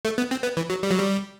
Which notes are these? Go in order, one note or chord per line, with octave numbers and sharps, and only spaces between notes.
A3
B3
C4
B3
E3
F#3
G3
F#3
G3